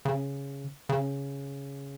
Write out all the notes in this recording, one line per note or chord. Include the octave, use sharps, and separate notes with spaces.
C#3
C#3